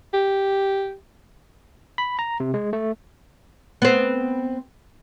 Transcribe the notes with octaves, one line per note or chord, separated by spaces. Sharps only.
G4
B5
A#5
C3
G#3
A3
B3 C4